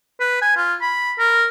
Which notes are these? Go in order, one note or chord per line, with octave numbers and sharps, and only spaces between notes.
B4
G#5
F4
B5
A#4